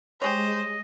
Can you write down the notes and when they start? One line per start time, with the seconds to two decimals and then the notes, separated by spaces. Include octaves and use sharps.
0.22 G#3 G4 G#4 C5 C#5 D#5